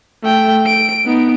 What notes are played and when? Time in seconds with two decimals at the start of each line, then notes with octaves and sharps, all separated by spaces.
0.23 A3 G5
0.66 D7
1.06 B3 D#4